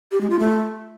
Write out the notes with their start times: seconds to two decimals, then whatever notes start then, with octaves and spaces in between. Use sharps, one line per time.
0.12 G4
0.21 G#3
0.30 F4
0.39 A3